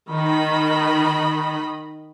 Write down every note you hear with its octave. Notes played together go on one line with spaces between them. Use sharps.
D#3 D#5 B5